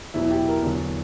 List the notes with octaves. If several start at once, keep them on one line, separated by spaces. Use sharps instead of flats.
E2 B2 F#3 E4
G4
A#4
E2 D3 F#3